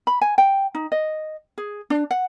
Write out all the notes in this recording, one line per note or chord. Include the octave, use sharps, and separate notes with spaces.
B5
G#5
G5
D#4
D#5
G#4
D4
F#5